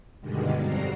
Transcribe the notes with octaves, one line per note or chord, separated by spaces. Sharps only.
G2 B2 D3 D#3 G3 G#3
F2 G3 C4 F#4 A#5 C7